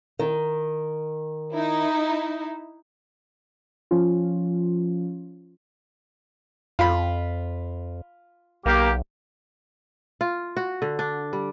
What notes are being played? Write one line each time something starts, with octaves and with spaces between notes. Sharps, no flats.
D#3
D#4 E4
F3 C#4 F4
F2 F4 B5
B1 A#3 G4
F4
F#4
D3
D4
G3